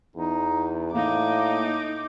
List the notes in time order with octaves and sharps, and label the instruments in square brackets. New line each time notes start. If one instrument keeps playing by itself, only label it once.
[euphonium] E2 [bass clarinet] D#4
[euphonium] A2 [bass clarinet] A#3 [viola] D#4 D6